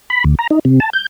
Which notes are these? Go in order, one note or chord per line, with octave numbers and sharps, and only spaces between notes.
B5
D2
A#5
D#4
C3
A5
G6